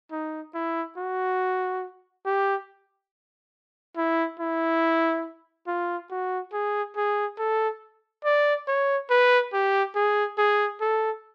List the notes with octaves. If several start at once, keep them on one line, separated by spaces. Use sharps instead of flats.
D#4
E4
F#4
G4
E4
E4
F4
F#4
G#4
G#4
A4
D5
C#5
B4
G4
G#4
G#4
A4